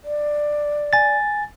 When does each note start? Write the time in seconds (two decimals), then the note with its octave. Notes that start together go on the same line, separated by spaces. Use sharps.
0.04 D5
0.93 G#5 A6